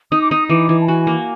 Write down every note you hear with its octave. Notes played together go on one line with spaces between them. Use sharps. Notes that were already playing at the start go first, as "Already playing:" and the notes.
D#4 D#6
D6
D#4 D#6
E3 D6
E3
A5
F#4 G#5
A#3